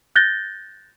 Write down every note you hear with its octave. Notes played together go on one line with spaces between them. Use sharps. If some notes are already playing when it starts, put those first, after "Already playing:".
F#6 G6 A6 A#6 G7